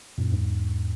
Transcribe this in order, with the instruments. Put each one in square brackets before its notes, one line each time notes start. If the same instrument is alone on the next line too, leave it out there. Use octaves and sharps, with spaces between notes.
[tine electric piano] F#2 A#2
E2 G#2